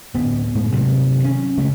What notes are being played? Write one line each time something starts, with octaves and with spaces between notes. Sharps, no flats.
D1 B3
A2 G#3
G2 C3 D#3 F#3
C#4
C#3 G#3 A3